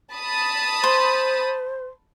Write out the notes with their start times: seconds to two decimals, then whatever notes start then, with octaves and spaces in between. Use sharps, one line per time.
0.13 A5 B5 D#6
0.84 C5 C6